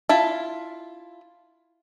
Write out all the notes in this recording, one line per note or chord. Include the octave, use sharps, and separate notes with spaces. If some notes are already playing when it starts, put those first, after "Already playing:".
E4 F4 A5